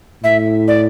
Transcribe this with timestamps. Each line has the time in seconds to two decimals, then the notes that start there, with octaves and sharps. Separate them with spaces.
0.23 A2 E5
0.68 D5